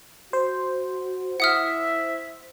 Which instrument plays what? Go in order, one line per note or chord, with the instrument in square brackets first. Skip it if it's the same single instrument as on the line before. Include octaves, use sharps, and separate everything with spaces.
[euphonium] F#4 [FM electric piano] C5
[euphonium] E4 [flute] E5 [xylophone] F#5 D#6 F6